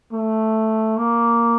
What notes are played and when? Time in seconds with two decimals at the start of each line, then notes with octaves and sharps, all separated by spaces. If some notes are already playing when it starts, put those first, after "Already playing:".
0.12 A3
0.97 A#3